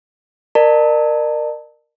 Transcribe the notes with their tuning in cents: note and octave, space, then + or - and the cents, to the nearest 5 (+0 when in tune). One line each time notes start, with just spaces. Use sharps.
A#4 +0 D5 +45 A5 +15